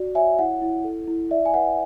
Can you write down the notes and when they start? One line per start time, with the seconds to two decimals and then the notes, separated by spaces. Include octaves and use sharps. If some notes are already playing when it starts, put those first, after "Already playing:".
Already playing: F#4 D5
0.15 C#5 E5 G#5
0.39 E4 F#5
0.62 E4
0.84 A4
1.08 E4
1.31 D5 E5
1.46 G#5
1.54 B4 F#5